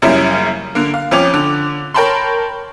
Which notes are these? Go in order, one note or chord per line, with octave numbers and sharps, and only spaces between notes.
F#2 C#3 G3 A#3 C#4 E4
D3 A#3
F5
F2 F3 C#4 D6 F7
D3
A#4 C#5 G5 A5 B5 C6